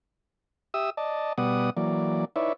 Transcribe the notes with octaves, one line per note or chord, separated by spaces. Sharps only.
G4 E5 D#6 E6
D5 D#5 A5
B2 G3 B3 D5 F#5 D#6
E3 F#3 A#3 D5
D#4 E4 B4 C#5 D5 E5